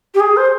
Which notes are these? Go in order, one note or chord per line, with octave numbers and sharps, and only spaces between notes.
G4
G#4
C5